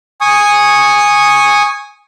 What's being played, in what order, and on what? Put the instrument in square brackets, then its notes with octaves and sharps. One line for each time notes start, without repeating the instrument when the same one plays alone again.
[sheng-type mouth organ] G#5 C#6 D#6